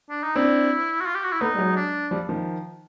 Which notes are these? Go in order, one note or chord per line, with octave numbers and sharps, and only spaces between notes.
D4
D#4
C4 D4 E4
F#4
F4
G4
F#4
E4
A3 B3 D#4
G3
F#3 G#3
D4
F3 G3
D#3 F3